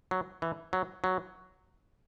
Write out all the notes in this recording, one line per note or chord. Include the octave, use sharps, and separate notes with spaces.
F#3
E3
F#3
F#3